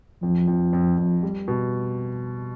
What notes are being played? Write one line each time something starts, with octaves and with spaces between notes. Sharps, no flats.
F2 F3
F2
F2
F2
G3
B2